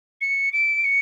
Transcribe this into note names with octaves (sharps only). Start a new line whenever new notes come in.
C#7
D7
C#7